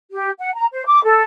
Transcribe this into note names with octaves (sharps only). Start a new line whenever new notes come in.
G4
F#5
A#5
C5
D6
A4